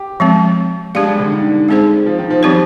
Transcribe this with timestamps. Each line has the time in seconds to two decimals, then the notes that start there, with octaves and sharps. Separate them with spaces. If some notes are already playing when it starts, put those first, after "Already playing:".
Already playing: G4
0.20 F3 G#3 C4
0.94 G#3 D4 G4 D5 F5
1.07 G3
1.19 D3
1.31 D#3
1.68 G#3 C4 D#4 G#4 C5
2.06 F3
2.19 D#3
2.30 F3
2.43 F3 G3 C4 G4 C5